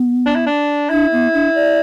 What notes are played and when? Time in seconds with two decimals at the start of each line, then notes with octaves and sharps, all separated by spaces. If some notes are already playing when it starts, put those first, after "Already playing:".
Already playing: B3
0.26 D4
0.35 E4
0.46 D4
0.90 D4 E4
1.12 B3
1.34 D4
1.55 D5